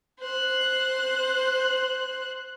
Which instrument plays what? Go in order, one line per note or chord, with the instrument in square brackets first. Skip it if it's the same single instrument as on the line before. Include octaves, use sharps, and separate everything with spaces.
[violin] C5 F#6